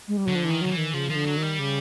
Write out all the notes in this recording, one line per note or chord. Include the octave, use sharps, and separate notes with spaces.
G#3
G3
D3 F#3
F3
E3
D#3
D#3 F#3
E3
D#3
C#3 F3
D#3 F3
D3
F#3
D#3
G3
C#3